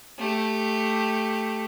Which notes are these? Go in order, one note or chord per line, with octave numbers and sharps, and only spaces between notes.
A3 G4